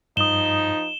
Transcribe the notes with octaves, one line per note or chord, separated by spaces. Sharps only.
G2 F3 D#4 D#6 E7 G7